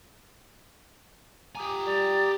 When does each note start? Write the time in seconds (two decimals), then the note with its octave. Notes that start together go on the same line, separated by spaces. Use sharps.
1.55 G4 G#5 A#5 D6 D#6
1.87 G3 A6